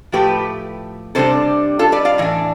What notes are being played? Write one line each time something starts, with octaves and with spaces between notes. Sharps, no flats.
A2 F3 A3 G4 B4
C3 G3 D4 A4 C5
F4 A4
B4 D5
D5 F5
A2 E3 D4